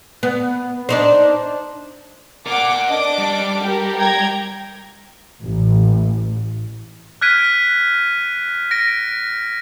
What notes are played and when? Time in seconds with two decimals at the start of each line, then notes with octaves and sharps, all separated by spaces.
0.23 B3
0.89 D4 D#4 C5
2.46 A#4 D5 F#5 D6
2.88 D4 D#5 D6 D7
3.18 G3
3.63 G4 A#4
3.98 G5 A#5 G#6
5.42 A1
7.21 F6 F#6 G#6 B6 D7 D#7
8.71 A#6 D7